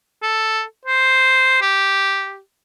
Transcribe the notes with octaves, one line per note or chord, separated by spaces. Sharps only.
A4
C5
G4